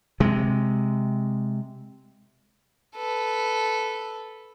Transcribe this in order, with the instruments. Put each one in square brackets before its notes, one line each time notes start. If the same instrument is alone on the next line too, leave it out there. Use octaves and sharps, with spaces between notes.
[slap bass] C3 G#3
[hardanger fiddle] A4 B4